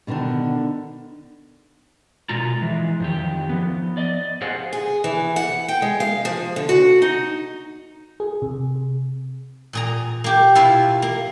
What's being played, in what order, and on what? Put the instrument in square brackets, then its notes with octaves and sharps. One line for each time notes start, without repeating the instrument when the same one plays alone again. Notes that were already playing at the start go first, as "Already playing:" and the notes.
[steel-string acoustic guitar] B2 D3 D#3 B3 D4
[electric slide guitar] B2 G#3 F4 A#5
E3 G#3
F2 D#3 G4
F3 B3
D5 D#5
G4 G#4 C5 F5 F#5
[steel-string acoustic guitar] G#4
E3
F#5
G5
G#3
F5
F3
D3
F#4
D#4
[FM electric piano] G#4
C3
[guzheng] A#2 G#4 A#5
A#3 G4
B2 E4 F4 E5 F5
A#3